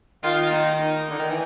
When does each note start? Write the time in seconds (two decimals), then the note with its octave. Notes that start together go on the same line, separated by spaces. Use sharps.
0.23 D#3 F4
0.53 D#4
0.81 D#4
1.10 D3 D#4
1.19 D#3
1.30 E3